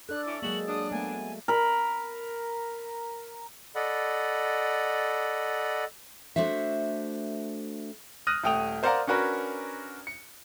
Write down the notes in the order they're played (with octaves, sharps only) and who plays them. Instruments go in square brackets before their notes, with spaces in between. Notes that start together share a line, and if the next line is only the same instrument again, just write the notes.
[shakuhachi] D4 [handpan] A4 D5 [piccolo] F#6
[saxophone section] C#4 E4 [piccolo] D6
[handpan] F#3 G#3 A#3 [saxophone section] F#4 E5 [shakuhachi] G#4 [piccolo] F#7
[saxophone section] D4 [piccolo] D#6
[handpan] A3 [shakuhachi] B3 [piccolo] G#5
[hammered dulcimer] A#4 B5
[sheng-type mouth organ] A4 D5 D#5 F#5 B5
[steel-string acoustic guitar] A3 D4 F#4 C5 E5
[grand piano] D#6 F6 F#6 A#6 D#7
D#1 A3 G5 D#6 F7
A#4 C5 D5 F5 F#5 A#5
C#4 D4 F#4 A#4 B4 C#5
C#7